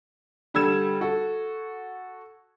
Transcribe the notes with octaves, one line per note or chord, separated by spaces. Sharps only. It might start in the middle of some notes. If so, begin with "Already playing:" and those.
D3 G3 A4 E6 G#6 E7
F#4 A4